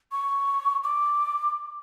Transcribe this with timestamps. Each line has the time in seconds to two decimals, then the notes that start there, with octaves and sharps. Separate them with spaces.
0.12 C#6
0.84 D6